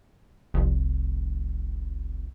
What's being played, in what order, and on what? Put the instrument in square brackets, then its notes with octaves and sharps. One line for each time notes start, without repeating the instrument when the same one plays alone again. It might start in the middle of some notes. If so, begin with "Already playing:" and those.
[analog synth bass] F1 [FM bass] C2